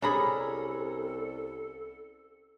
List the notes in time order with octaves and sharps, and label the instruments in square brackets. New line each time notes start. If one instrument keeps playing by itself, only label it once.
[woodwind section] C2 [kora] C#4 G#4 [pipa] D4 A#5 B5 [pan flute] A4